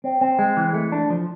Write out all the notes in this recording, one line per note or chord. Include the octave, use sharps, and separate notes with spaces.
C4
C4
G#3
E3
A3
D4
F3